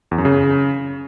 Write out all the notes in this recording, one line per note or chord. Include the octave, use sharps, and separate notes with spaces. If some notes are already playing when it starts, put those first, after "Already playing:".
E2
F#2
C#3